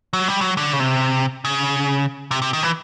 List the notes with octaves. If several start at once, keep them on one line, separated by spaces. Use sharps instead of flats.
F#3
G3
F#3
D3
C#3
C3
C#3
C3
C3
D#3
E3